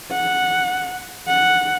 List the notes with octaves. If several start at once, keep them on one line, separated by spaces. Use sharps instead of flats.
F#5
F#5